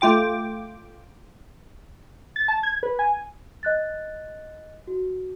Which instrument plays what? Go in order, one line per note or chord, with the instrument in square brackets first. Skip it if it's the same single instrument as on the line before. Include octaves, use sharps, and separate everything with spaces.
[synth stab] A3 F4 G5 D6
[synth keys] A6
A5
G#6
B4
G#5
[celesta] D#5 F#6 A6
F#4